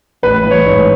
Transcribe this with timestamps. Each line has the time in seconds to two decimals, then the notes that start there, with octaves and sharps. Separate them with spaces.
0.23 A1 B4
0.44 E3
0.51 C#5
0.65 G#2